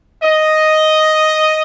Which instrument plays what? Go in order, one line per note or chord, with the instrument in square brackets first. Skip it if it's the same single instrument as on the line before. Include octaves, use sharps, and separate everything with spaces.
[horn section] D#5